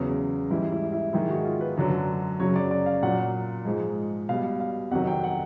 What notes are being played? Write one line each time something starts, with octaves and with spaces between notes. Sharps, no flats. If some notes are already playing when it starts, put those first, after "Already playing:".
Already playing: E2 C#3 F#3
G#2 E3 G3 E4
E4
E4
G#2 D#3 G#3 E4
F#4
F4
B4
F#2 D3 F#3
F#2 C#3 F#3 C#5
D5
D5
F5
A#2 F#3 F#5
G#2 F3 G#3
B2 G3 F5
F5
F2 C3 D#3 F#3 F#5
G5
F#5